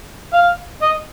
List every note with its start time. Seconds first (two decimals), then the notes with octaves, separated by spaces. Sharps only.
0.33 F5
0.82 D#5